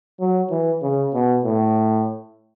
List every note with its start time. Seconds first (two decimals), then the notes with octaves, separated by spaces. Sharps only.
0.20 F#3
0.50 E3
0.82 C#3
1.14 B2
1.45 A2